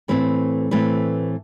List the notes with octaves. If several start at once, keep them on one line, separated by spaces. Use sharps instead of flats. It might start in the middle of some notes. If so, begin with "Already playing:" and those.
A2 E3 A3 C4 B4
A2 E3 A3 C4 B4